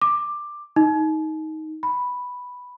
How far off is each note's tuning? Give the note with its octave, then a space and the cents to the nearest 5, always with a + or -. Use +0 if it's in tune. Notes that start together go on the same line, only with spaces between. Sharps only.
D6 +10
D#4 +15
B5 +0